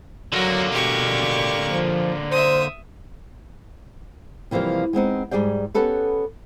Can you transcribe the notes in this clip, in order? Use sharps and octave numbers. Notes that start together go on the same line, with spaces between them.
D3 F#3 A#3 F#4
B2 G4 C#6
F3
C5 E5 D#6
C3 E3 F3 G3 A#3
G#3 B3 C4 D#4
G#2 G3 G#4 D5 G5
B3 C#4 G4 A4 B4